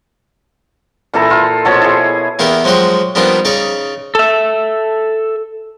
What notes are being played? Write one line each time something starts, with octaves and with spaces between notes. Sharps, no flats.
A#2 E3 A4 A#5
F4
B2 F3 A4 C#5
E4 G#4
E2 A#3 B3 E4 G4 E5
F3 F#3 G#3 F#4 G4
F3 G3 A#3 B3 D4 D#4
C#3 D#4 D5 C#6
A4 E5